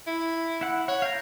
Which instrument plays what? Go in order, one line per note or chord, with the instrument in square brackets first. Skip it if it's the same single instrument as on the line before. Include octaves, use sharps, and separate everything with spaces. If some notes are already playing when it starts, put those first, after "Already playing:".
[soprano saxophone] E4
[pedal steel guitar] E4 F#5
[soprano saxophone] C#5 [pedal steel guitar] F#5
[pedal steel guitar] F5 G5 A#5